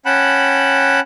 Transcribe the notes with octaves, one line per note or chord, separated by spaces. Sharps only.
C#4 F#5 G5 A5 B5 F#6